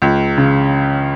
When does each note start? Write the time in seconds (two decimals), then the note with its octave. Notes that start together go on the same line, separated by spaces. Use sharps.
0.02 C#2
0.37 C#3